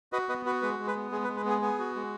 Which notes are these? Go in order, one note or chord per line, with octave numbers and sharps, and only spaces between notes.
F#4 B4 D#5
B3 B4 D#5
F#4 B4
G#3 B4
G#3
B4
B3
G#3 G#4
B4
G#3
B4
B3 G#4
B3 G#4
F#4
G#3